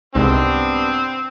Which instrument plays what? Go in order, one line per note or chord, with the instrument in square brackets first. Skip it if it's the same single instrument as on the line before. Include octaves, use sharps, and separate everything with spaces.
[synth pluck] C2 G#2 [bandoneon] G3 B3 D4 [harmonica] C4